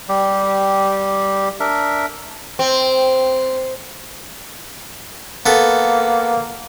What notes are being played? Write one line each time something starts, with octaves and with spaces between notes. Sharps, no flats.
G3 G4
D4 A#4 E5
C4
A#3 B3 A4